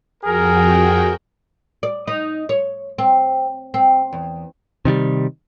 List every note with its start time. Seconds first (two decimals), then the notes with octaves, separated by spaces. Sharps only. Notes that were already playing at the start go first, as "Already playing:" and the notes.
0.24 F2 F#4 G#4 A#4 G5
1.83 D5
2.08 D#4
2.49 C#5
2.98 C4
3.74 C4
4.13 E2
4.85 C3 D#3 F3 G3